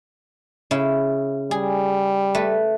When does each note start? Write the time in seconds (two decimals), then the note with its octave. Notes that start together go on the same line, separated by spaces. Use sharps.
0.71 C#3 E4
1.51 G3 G#4
2.35 A3 B4